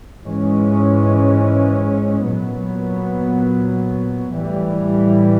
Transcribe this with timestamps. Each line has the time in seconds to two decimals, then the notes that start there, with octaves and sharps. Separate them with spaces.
0.22 G#2 E3 G#3 C#4
2.28 A#2 F#3 B3
4.32 A2 E3 G3